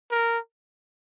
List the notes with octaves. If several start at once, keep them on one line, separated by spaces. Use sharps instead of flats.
A#4